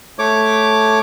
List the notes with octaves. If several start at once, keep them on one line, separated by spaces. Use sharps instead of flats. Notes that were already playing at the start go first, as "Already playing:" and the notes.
A3 C#5 D6